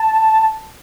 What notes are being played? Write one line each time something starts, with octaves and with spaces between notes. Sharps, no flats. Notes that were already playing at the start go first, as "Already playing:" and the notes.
Already playing: A5